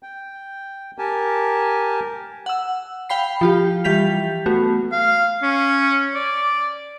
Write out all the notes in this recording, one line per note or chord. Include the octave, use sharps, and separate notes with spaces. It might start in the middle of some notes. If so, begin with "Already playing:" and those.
G5
G4 A#4 G#5 A5
F#5 E6
F5 G5 B5 C7
F3 F4 G4
E3 G3 G4 G6 B6 F7
A3 B3 F#4
F5
C#4
D5